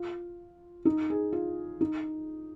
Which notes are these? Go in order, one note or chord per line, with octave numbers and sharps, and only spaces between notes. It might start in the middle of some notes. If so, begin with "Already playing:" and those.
Already playing: F4
D#4
G#4
F4
D#4